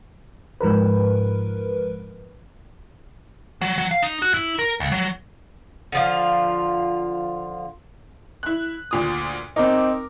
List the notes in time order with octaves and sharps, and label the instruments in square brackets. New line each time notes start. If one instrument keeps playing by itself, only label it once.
[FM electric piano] G#2 F3 A#4 B4
[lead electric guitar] F#3
F#3
F5
D#4
F#4
E4
A#4
C#2
F#3
[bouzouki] D3 F3 F4
[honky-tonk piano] E4 F#6
D2 A#2 D#6
[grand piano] C4 D#4 [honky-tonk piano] A#4 D6